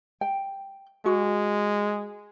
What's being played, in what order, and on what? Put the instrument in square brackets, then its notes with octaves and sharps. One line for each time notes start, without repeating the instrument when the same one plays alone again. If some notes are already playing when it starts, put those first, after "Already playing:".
[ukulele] G5
[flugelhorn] G#3 [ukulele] F#4